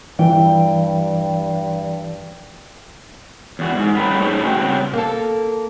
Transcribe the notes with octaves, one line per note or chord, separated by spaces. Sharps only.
G2 E3 G5
E2 F#4
G#2
F#3 G3 A3 A#3 C#4 B4
A3 D#4 G#4 A4 C5 C#5
C#4 D4 F#4 G5
C#3 G3 B3 C4
A#3 A4